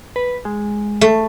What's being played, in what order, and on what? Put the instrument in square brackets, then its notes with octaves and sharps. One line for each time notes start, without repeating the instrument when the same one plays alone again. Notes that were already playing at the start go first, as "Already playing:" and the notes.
[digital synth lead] B4
G#3
[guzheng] A3